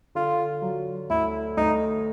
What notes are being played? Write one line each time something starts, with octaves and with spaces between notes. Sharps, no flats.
D3 F4
F#3
D2 E4
D2 D#4